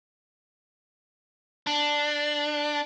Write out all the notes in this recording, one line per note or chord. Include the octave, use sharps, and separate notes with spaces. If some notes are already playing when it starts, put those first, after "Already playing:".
D4